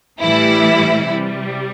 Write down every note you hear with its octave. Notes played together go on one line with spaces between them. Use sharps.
A2 E3 G3 E4
C3 G3